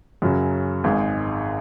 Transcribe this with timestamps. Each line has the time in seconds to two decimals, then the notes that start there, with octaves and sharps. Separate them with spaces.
0.22 F#2 C#3 F#3 C#4
0.84 G#1 G#2 G#3